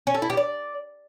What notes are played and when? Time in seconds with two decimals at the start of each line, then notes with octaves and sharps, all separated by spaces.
0.07 C#4
0.14 A4
0.22 E4
0.30 G4
0.37 D5